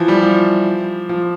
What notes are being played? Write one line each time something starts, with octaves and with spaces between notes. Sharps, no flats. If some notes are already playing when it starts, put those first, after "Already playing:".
Already playing: E3 F3
G3
F3
F3